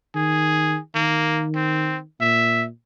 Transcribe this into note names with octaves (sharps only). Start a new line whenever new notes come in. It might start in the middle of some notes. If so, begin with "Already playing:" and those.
D#3 G#4
D#3 A#3
C4
A#2 E5